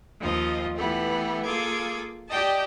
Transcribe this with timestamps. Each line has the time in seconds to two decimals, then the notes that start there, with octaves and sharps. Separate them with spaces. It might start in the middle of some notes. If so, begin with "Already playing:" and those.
0.20 D#2 F3 F4 D#5
0.76 E3 A3 B3 G4 A4
1.45 A#3 F4 G#4 A4 D6 G#6
2.29 G4 D5 D#5 G5 A5